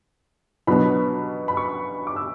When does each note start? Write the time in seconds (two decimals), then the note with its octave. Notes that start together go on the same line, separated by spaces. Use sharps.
0.67 B2 F#3 B3 D4 B5
1.48 B5
1.57 C#6
2.07 D6
2.16 E6